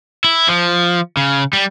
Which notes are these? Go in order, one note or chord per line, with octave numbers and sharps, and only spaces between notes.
E4
F3
C#3
G3